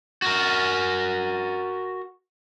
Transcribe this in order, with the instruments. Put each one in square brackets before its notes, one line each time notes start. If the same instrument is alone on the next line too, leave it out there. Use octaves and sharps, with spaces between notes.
[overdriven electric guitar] F#4 A#4